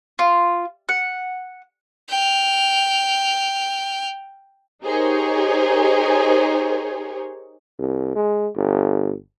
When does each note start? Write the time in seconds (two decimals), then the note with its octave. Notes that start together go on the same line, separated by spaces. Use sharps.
0.19 F4
0.89 F#5
2.10 G5 F6
4.83 D#4 G4 G#4 A#4 C5 C#5
7.79 C2
8.16 G#3
8.56 G1